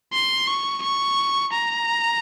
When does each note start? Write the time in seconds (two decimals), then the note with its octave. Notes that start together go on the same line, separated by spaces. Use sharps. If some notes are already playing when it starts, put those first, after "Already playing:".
0.13 C6
0.47 C#6
0.82 C#6
1.53 A#5